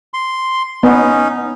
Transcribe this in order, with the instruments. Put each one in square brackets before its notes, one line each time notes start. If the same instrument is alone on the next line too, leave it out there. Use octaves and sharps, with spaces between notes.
[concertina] C6
[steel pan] B3 [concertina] C#4 D#4